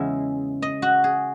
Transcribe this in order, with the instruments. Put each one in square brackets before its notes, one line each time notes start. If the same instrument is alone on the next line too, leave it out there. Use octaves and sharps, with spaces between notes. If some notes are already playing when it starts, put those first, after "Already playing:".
Already playing: [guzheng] E2 C#3 G#3 E5
D#5
F#4
G#4